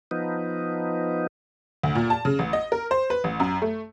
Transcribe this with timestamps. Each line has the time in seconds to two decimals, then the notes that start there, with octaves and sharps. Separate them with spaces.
0.11 F3 B3 D#4
1.83 D2
1.95 A#2
2.10 A5
2.25 C#3
2.39 A1
2.53 D#5
2.72 A#4
2.91 C5
3.10 B4
3.24 A1
3.40 F#2
3.62 A3